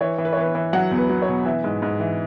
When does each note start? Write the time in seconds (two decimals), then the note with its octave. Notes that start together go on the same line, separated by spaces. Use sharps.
0.01 E3 C#5
0.18 E3
0.25 B4
0.33 C#5
0.37 E3 B4
0.55 E3
0.73 F#3 F#5
0.91 E2
0.98 B4
1.09 F#3
1.22 C#5
1.28 B2
1.46 E3 E5
1.64 G#2
1.82 G#2
2.00 E3